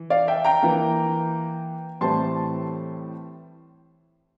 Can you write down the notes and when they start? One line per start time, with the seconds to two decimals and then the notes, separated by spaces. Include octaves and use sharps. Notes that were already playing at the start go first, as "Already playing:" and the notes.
Already playing: E3
0.10 D5 F5
0.28 E5 G5
0.45 G5 A#5
0.63 E3 A#3
2.01 A2 E3 G3 C4 A5 C6